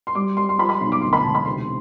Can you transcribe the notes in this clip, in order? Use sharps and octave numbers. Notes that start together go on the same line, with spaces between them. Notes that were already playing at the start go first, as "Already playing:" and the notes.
C6
G3 D6
G3 C6
C6
F3 B5
B5
B1 C6
D6
D2 C6
B5
E1 A5
B5
C3 C6